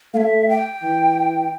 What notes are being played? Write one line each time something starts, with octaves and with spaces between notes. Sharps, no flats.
A3 E5 F5
G5
E3